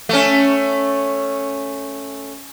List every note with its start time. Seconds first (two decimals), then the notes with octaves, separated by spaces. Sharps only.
0.09 A3 C#4